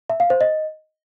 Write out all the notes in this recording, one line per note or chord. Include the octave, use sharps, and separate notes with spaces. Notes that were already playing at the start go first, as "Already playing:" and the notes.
E5
F5
C5
D#5